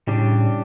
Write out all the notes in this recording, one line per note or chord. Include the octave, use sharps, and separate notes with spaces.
A2 C#3 G3 D4